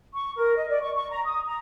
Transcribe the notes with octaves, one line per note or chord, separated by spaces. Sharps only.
C#6
A#4
D#5
D5
C#6
C#6
A#5
D#6
A#5